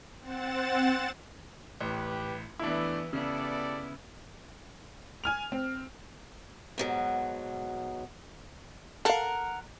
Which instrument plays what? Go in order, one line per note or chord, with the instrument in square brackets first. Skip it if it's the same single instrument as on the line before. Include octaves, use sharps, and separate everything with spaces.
[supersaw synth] C4 F#5 A6 E7
[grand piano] A1 [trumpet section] G4 B4
[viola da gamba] E3 B3 [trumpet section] A3 [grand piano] D4 E4
[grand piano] C#3 [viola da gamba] B3 E4 [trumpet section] G4 A4 D5
[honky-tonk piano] G#5 F6 F7
C4
[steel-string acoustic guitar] G#2 B2 F#3
[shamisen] A4 F5 [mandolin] A#4 F#5